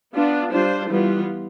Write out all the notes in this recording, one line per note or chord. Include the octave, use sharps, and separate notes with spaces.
B3 D4 F4
G3 D4 F4 C5
E3 G3 B3 F4